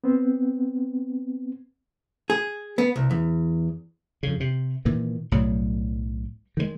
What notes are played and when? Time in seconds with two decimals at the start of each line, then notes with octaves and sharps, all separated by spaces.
0.04 B3 C4
2.30 G#4
2.78 B3
2.96 C2
3.11 E2
4.23 F2 C#3
4.40 C3
4.85 A#2 D#3 E3
5.32 B1 A2 F#3 G3
6.57 D#3 E3 G#3